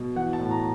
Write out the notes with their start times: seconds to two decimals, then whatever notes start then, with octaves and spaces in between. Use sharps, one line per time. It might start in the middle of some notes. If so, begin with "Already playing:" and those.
Already playing: B2
0.16 E3 F#5
0.33 A5
0.39 A2
0.51 A#5